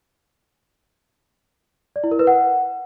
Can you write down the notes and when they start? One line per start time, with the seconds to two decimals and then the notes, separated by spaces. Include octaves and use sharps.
1.96 D5
2.04 E4
2.11 A#4
2.19 B4
2.27 F#5